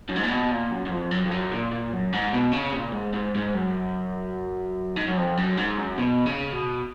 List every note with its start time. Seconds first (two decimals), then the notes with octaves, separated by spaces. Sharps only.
0.09 F#2
0.16 G#2
0.23 A#2
0.30 B2
0.51 A#2
0.71 F#2
0.86 F#2
0.90 F2
1.11 F#2
1.25 F2
1.32 F#2
1.52 A#2
1.72 A#2
1.93 F#2
2.13 G#2
2.34 B2
2.53 C#3
2.73 A#2
2.93 G#2
3.14 G#2
3.35 G#2
3.55 F#2
4.96 G#2
5.07 F#2
5.17 F2
5.37 F#2
5.57 G#2
5.78 F#2
5.98 B2
6.26 C#3
6.53 B2